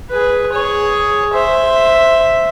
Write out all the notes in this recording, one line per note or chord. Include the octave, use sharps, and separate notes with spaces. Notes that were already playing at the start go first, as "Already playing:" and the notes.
G#4 B4
G#4 C#5
C5 E5